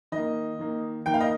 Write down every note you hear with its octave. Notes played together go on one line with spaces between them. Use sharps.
D#3 A#3 D#5
D#3 A#3
D#3 A#3 G5
F5
D#5